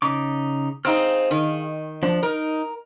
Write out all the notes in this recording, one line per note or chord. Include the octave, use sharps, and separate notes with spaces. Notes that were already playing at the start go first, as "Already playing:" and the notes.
C#3 D#4 D6
C4 D#4 G#4 F5 F6
D#3
F3 D4
D#4 A#4